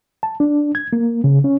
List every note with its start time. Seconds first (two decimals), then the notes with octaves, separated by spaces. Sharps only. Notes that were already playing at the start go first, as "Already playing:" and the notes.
0.23 A5
0.40 D4
0.75 G#6
0.93 A#3
1.24 C#3
1.44 C#4